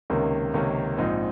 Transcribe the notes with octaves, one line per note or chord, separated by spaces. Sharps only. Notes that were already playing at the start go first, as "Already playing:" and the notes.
C#2 C3 D#3 A#3 C#4
C#2 C3 D#3 A#3 C#4
A#1 G#2 F3 C4 D#4